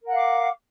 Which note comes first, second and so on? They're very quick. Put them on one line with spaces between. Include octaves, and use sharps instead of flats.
A#4 F#5 F5 D6